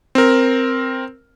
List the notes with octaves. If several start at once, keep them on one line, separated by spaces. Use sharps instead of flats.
C4 A#4